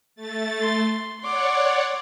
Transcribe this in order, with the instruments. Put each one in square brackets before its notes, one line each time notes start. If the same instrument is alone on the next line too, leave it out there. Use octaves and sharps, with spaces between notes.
[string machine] A3 A6
[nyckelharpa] C6
[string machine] C#5 D5 F#5 [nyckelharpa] C6 D6